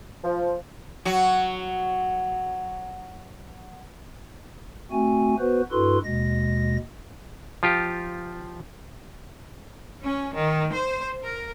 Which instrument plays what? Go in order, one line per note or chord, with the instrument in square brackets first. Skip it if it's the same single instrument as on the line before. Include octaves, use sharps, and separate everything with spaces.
[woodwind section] F3
[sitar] F#3 F#4
[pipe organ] A3 C4 F#4 G#5
B3 F#4 B4 C5
G2 E4 F#4 A4 B4 C6
D#2 B2 G#3 A#6
[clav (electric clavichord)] F3 F4 G4
[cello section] C#4
D#3
C5
A#4